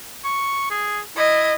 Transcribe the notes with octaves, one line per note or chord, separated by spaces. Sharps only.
C#6
G#4
E4 D#5